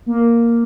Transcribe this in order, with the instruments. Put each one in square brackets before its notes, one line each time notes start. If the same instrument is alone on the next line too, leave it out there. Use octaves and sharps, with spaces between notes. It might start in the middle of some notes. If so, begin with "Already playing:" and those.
[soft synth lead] A#3